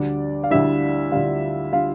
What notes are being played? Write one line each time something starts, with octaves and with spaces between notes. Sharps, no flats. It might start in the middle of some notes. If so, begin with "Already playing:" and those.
Already playing: D2 D3 G3 D4 D5
F5
D2 D3 G3 E4 E5
D2 D3 G3 F4 F5
D3 G3 F4 F5